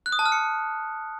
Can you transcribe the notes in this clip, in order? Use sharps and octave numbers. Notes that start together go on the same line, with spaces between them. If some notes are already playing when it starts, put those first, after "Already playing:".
F#6
D#6
A5
F6
C#7